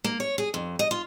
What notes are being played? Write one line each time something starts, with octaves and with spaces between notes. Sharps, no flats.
A#3
C#5
G#4
F2
D#5
F4